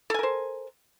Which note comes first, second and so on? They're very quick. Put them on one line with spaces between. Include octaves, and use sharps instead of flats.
A4 G#5 A#4 C5